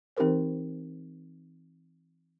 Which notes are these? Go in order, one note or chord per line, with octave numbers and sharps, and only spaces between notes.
E3 C4 D#4 G4 A#4 C5